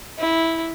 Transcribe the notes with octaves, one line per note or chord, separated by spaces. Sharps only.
E4